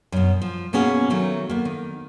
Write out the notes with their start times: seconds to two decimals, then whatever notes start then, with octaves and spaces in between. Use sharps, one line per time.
0.12 F#2 B2
0.42 F3
0.73 B2 A#3 B3 C#4 G#4 F#5
1.10 D#3 F#3 A3
1.50 A#3 B3
1.65 D#3